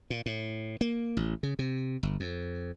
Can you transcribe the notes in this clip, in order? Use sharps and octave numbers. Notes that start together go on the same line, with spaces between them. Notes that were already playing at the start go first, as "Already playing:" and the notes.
A#2
A2
A#3
A1
C#3
C3
G1
F2